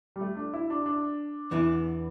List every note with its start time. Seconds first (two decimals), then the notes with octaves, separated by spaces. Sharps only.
0.16 G3
0.21 A3
0.37 D4
0.54 E4
0.70 D4
0.86 D4
1.51 E2 E3 B3 E4